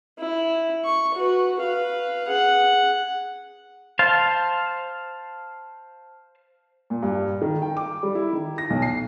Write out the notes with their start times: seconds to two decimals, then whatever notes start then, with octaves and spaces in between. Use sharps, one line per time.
0.19 E4
0.84 C#6
1.14 F#4 B4
1.59 B4 F5
2.27 G#4 F#5
3.99 C5 F5 A5
6.90 A#2
7.02 G2
7.41 D#3
7.62 G5
7.77 D6
8.03 G3
8.15 E4
8.33 D#3
8.58 A#6
8.70 B1
8.82 C7